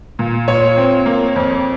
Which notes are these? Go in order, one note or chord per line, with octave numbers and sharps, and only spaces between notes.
A#2
A#2 C#5
C4
A#3
F2